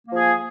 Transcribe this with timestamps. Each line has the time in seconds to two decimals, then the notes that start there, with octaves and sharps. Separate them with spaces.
0.07 A#3
0.12 F3
0.16 G#4